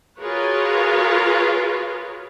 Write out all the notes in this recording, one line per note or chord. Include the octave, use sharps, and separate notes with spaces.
F4 F#4 G#4 A#4 B4 C#5